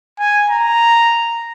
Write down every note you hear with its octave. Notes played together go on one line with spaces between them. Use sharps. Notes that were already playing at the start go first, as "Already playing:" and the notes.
G#5
A#5